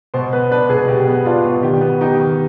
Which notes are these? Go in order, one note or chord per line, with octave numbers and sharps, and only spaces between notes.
B2 C5
B3 B4
D4 B4
B2 G#4
B2 G4
B3
D4 F4
B2
D#3 G4
B3
D#4 G4
D#3